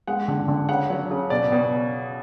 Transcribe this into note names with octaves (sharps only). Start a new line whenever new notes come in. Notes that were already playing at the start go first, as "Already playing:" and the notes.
G#3 F#5
D3
D3
C#3 F#5
F#3
C#3
B2 D5
B2